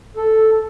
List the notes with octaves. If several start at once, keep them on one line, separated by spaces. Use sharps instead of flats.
A4